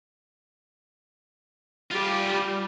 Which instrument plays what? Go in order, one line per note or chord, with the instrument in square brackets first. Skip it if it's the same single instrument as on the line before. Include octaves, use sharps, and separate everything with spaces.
[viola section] G3 [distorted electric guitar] F4 G4